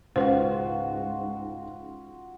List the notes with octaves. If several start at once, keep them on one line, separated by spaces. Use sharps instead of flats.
C#2 G#2 F4 F#4 B4 C5